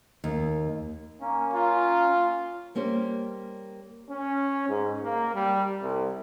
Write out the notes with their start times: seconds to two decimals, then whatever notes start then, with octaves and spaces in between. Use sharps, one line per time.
0.24 D#2
1.21 A#3 C#4
1.54 F4
2.75 G3 A#3 C#4 G4 C5
4.10 C#4
4.69 G#2
5.03 A#3
5.34 G3
5.80 C2